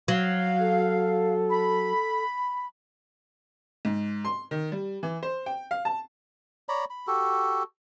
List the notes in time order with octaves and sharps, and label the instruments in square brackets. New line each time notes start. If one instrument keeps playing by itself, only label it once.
[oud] F#3 [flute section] F5
[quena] A4
[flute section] B5
[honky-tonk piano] G#2
C6
D#3
G3
E3
C5
G5
F5
A5
[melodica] C#5 D5 A#5 B5
B5
F#4 G4 A4